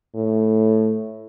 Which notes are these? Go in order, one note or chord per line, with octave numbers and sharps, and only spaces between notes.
A2